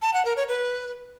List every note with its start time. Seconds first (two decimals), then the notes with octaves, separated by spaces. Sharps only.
0.02 A5
0.14 F#5
0.25 A#4
0.37 C#5
0.48 B4